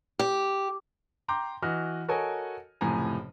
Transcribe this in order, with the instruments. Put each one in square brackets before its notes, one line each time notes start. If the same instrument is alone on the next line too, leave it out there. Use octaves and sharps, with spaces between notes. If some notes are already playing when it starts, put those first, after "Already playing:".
[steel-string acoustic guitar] G4
[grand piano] G5 A#5 C6 D6 G6
E3 F#4 D#5 F6
F#4 A4 A#4 C#5 D#5 G#5
F#1 A2 C3 F3 G#5 A#5